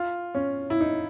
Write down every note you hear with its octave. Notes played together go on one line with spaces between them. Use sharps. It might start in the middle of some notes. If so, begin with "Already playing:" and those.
Already playing: F4
C#4
E4
D#4